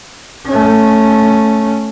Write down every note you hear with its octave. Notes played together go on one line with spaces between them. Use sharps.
A3 C#4